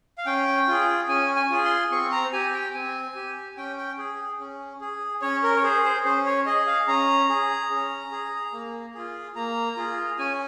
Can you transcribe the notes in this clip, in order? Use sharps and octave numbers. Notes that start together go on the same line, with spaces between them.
F5
C#4 G5
F4 G#4
C#4 G#5
G#5
F4 G#4
C6
C4 C#6
A#5
G4 G#5
G5
C4 G#5
G4
C#4 G5
G5
G#4
C#4
G#4
C#4 C#5
A#4
C#5
G#4 C5
C5
C#4 C5
C#5
G#4 D#5
F5
C#4 A#5
G#4
C#4
G#4
A#3
F4 G#4
A#3 A#5
F4 G#4
C#4 G#5